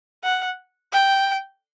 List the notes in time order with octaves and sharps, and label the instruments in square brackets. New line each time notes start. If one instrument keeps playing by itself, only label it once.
[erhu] F#5
G5